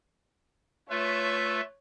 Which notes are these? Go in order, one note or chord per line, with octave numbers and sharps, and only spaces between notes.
A3 F4 B4 C#5 E5